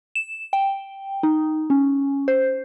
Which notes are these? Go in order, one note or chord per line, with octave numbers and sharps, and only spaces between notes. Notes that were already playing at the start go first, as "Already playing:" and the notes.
E7
G5
D#4
C#4
C5